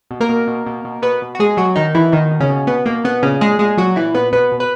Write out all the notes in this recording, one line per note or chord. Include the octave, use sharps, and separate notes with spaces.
B2
A#3 A#4
B2
B2
B2
B2
B2 B3 B4
B2
F#4
B2 G#3 G#4
B2 F#3 F#4
B2 D#3 D#4
B2 E3 E4
B2 D#3 D#4
B2
C#3 C#4
B2
B2 B3
B2 A#3
B2 B3
A#2 C#3 C#4
A#2 G#3 G#4
A#2 G#3 G#4
A#2 F#3 F#4
A#2 E3 E4
A#2 B3 B4
B2 B3 B4
B2
B4